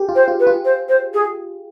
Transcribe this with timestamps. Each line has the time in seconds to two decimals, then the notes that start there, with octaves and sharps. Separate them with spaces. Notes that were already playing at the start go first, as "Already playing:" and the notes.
Already playing: G4 G#4
0.09 F4
0.15 C5
0.28 F4
0.40 B4
0.47 F4
0.65 C5
0.89 C5
1.14 G#4